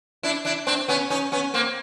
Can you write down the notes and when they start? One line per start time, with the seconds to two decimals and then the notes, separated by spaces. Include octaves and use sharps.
0.23 D4 E4
0.45 D4 E4
0.67 C4 D4
0.88 B3 C#4
1.10 C#4 D#4
1.32 B3 C#4
1.54 A#3 C4